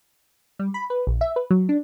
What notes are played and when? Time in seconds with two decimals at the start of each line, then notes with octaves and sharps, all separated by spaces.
0.59 G3
0.74 B5
0.90 B4
1.07 A#1
1.21 E5
1.36 B4
1.51 F#3
1.69 D4